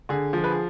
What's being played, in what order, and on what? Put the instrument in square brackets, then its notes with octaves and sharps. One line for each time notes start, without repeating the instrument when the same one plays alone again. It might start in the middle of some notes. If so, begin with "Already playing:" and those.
[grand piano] D3 G#4
F3
B4
G#4